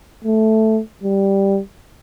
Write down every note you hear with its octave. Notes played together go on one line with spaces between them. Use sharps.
A3
G3